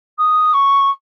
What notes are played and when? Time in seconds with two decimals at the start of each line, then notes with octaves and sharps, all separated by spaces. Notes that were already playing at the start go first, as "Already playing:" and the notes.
0.18 D#6
0.53 C#6